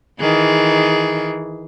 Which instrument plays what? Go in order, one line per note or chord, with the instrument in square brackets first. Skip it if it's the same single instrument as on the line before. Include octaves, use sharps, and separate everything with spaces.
[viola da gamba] D#3 E3 G#4